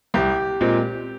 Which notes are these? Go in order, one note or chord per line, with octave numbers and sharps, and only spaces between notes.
C2 G4
A#2 G#3 C4